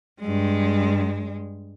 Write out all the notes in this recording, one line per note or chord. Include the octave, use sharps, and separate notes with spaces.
G2 G#3